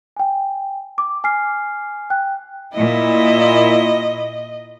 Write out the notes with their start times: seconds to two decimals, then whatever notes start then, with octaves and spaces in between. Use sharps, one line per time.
0.17 G5 G#5
0.98 D6
1.24 G#5 F6 C7
2.10 G5 F#6
2.73 A#2 E4 D#5